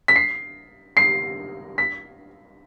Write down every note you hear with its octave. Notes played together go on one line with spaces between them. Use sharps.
B6
C7
C7
B6